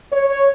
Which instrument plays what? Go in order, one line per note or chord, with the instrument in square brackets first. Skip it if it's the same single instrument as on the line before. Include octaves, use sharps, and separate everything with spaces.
[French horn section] C#5